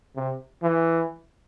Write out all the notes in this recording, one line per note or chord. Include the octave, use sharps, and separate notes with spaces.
C3
E3